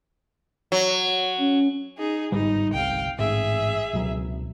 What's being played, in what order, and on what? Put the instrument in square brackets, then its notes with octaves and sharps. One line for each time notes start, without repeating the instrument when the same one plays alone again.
[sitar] F#3
[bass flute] C#4
[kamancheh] D#4 G#4
[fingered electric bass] G1 G#2 G3 [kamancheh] D#4
[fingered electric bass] G1 C2 [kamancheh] F5 G5
[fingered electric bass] A1 G#2 [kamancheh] G#4 E5
[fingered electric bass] C#2 B2 F#3